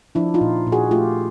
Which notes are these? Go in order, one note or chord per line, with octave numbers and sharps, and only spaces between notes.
F3 D4 E4
D#4 F4
A#2
A#2
F#4 G#4
A3 F4 G4